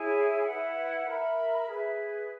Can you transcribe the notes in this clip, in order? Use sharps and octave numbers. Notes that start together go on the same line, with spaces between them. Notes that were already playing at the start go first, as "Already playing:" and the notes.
Already playing: E4 G#4 C#5 G#5
E4 B4 F#5
A#4 E5 B5
G#4 B4 E5